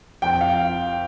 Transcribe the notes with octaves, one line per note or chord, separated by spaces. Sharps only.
F2 G5
F5